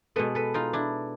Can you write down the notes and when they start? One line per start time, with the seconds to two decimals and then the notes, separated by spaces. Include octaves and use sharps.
0.16 B2 G#3 B3 A4 B4
0.35 A4 B4
0.54 D#4 F4
0.73 D4 E4